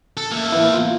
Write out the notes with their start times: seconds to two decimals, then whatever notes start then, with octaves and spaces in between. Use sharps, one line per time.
0.17 A4
0.32 A#3 E5
0.52 E3 B3 E4
0.73 F4